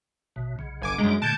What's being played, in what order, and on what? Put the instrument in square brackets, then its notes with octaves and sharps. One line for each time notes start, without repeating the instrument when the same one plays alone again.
[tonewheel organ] A1 B2
B1 C#3
[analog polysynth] G1 G#5 D6
[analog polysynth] F#2 G#3 [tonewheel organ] G3 D4 A#5
[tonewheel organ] A#2 D3 A3 [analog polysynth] A5 G6 G#6